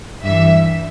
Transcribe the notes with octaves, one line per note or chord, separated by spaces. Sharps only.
G2 E3 E5